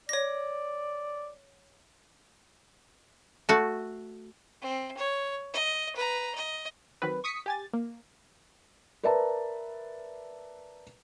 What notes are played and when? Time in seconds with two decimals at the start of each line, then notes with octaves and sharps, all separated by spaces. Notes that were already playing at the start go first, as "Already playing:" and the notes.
0.09 C#5 D5 A#6
3.49 A3 F#4
4.61 C4
4.97 C#5
5.53 D#5
5.96 B4 A#5
6.35 D#5
7.02 D#3 F#3 C4 B4
7.24 C#6 D#6 B6 C#7
7.46 G4 G#5 A6
7.73 A#3
9.03 A#4 B4 D5 E5 A5 A#5